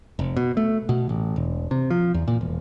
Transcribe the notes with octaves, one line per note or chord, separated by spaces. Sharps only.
F1
B2
A3
B2
A1
E1
C3
F3
E2
A#2
E1